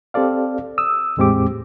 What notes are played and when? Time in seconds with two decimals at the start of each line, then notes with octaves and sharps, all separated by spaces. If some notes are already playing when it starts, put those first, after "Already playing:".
0.14 C4 G4 A4 D5 F5
0.78 D#6 E6
1.17 E2 A2 G#3 C4 G4 D6